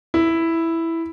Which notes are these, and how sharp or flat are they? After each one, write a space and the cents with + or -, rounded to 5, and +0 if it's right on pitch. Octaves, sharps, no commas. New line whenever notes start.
E4 +0